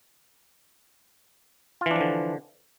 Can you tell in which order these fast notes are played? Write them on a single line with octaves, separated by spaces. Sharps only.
F4 E3 D4 F3 D3